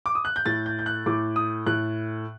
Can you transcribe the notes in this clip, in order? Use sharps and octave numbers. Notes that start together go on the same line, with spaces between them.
D6
D#6
F#6
G6
A2 A6
G6
G6
F#6
A2 D6
D#6
A2 F#6